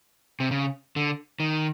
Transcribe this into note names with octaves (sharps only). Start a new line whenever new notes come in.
C3
C#3
D3
D#3